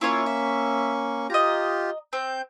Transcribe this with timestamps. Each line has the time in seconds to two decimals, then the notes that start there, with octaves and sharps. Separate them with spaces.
0.01 A#3 C#4 E4 F4 C#5 C#6
0.26 E5
1.30 F4 G4 D#5 A#5
2.13 C4 G6